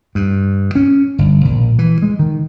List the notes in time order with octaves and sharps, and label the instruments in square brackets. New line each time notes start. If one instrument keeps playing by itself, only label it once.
[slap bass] G2
C#4
G1
A#1
E3
G#3
D#3